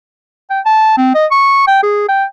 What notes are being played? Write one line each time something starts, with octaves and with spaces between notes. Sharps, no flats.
G5
A5
C4
D#5
C#6
G5
G#4
G5